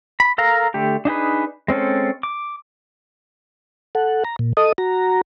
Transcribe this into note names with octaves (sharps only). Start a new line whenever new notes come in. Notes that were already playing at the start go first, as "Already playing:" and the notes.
B5
A4 A#4 F5 A#5
D3 A3 G4
D4 D#4 G#4 B4
G#3 C4 C#4 A4
D6
A4 F#5
A#5
A#2
A4 D#5 D#6
F#4 A#5